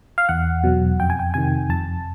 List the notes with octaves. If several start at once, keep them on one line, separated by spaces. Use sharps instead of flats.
F5
E2 F#5
B2 F#3
F2 G5
G#5
G5
C3 D#3 G#5
F2 A5